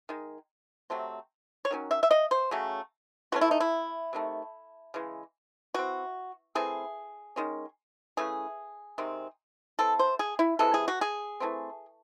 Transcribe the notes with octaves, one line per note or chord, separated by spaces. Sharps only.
D#3 G#3
C3 F#3 A3 C4
C#5
D#3 F#3 C#4
E5
E5
D#5
C5
C#3 F#3 A3 C#4
E3 A3 C#4 F#4
E4
D#4
E4
C3 D#3 A3
C#3 E3 G#3
E3 C4 F#4
E3 A3 C4 G#4
D#3 G#3 C#4
C#3 E3 A3 C#4 G#4
C3 D#3 G#3 C4
E3 C4 A4
C5
G#4
E4
C3 E3 G#3 A4
G#4
F#4
G#4
E3 A3 C4